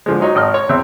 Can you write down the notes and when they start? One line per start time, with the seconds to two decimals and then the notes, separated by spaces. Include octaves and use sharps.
0.06 D3 F3 G#3
0.20 F#3 D#4 C#5
0.35 G#1 D#5 F6
0.54 C#5
0.69 E2 C4 E5